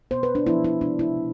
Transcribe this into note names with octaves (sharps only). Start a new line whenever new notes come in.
B2 B3 C5
B4
D4
C3 F3 B3 E4
E4
C3 G#3 B3 D4
E4
B2